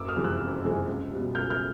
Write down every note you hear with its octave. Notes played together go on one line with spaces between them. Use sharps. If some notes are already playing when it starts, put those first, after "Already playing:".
Already playing: F#1 D6 E6
D#6 F6
F2 C3 E3 G#3
E6 F#6
F#1
F2 C3 E3 G#3
C#2
B2 G3
C#2 F6 G6
F6 G6